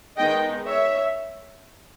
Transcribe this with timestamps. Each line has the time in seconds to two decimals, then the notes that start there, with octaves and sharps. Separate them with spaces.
0.17 D#3 G#3 B3 D#4 D#5 G5
0.66 C#5 E5